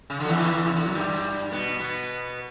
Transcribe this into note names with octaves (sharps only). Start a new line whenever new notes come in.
C#3
D3 F#3
E2 E3
C#3
D3
F#2 F#3
G2 G3
B2 B3
B2 B3